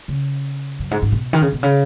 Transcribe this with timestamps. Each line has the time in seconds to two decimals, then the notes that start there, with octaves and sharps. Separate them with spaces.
0.08 C#3
0.79 F#2
0.91 G#2
1.02 G#2
1.12 B2
1.33 D#3
1.42 C#3
1.52 B2
1.63 C#3